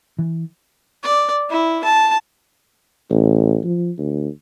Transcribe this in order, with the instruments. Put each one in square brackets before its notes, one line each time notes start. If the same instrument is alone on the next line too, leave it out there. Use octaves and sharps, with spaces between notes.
[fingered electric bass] E3
[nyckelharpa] D5
E4
A5
[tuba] A1
F3
D2